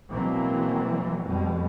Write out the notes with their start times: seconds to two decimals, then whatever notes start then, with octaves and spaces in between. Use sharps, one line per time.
0.12 B2 E3 F#3 G#3 A#3 C4
1.23 F2 B2 G3 G#3